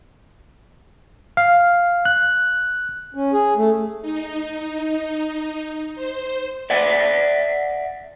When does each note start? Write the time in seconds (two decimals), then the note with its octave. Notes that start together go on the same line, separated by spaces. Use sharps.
1.37 F5
2.05 F#6
3.15 C#4
3.33 G#4
3.57 A3
4.02 D#4
5.95 C5
6.70 D5 E5 F#5